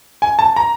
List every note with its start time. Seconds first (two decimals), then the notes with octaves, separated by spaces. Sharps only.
0.22 G#5
0.39 A5
0.56 A#5